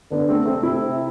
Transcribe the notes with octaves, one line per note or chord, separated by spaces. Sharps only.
D3 B3 D4
A3 C4
C3 A3 C4
C4 E4
C3